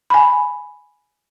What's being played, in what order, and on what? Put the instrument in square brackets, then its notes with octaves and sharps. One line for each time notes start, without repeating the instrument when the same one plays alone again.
[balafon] G#5 B5